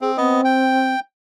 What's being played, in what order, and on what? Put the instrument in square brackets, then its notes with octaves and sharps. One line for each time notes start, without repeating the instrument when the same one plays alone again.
[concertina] C4 [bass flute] G#4
[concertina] B3 D#5 [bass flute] C4
[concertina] G5